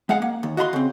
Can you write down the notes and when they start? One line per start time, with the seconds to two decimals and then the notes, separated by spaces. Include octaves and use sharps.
0.09 G#3 F5 F#5
0.22 A#3
0.43 D#2
0.57 F#4 D#5 F5 B5 C6
0.73 C#3 C4